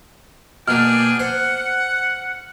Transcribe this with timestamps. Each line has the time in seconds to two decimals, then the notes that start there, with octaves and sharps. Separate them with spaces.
0.68 B2 A#3 D4 G#4 G5 F6
1.19 C5 F#5